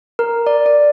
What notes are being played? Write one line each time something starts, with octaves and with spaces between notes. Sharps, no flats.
A#4
D5
D5